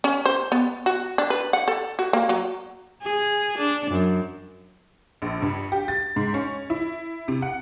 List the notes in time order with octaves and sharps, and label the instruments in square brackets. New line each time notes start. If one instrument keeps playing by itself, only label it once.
[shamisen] C#4
C5
B3
F#4
D4
B4
F#5
A4
F#4
A#3
F#3
[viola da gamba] G#4
D4
F#2
[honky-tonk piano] A#1
G2
G4
A6
G#2
C#4
E4
C3
F#5